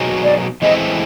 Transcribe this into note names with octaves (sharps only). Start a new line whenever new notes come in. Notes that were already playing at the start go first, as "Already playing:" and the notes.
Already playing: B2 F#3 B3 D#4 G#4
D5
E3 G#3 C4 E4 A4 D#5